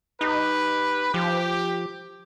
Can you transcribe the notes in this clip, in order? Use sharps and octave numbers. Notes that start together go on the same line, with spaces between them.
D#4 G4 B4
F3 G4